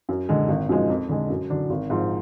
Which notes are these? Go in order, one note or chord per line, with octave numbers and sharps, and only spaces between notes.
F#2
D3 G#3
G#1
F#2 F3 G#3 D#4
F2
D3 G#3
F#2
D3 F#3 D4
G#1
G#2 F3